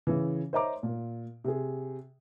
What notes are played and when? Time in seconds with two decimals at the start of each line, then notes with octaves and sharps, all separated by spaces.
0.07 C#3 E3
0.53 C5 C#5 D#5 E5 A#5 D6
0.83 A#2
1.44 C3 G#4